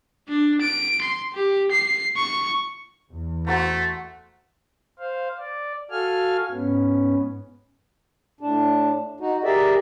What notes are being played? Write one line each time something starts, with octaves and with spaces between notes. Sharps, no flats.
D4
D7
C6
G4
C7
C#6
E2
A3 F#4 C5 A#5
C5 F5
D5
F#4 A4 F5 G#5 F6
G#2 B3 C#4
A2 D4
D#4 F#4
G4 G#4 A#4 D5 E5